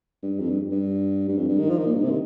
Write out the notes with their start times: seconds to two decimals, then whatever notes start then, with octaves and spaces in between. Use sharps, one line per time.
0.23 G2
0.39 F2
0.50 G2
0.72 G2
1.28 G2
1.38 F2
1.48 G2
1.59 D#3
1.70 F3
1.78 D#3
1.86 A#2
1.95 G2
2.03 C3
2.11 D#3